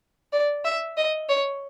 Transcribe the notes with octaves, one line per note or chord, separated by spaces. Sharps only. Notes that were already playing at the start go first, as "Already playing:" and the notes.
D5
E5
D#5
C#5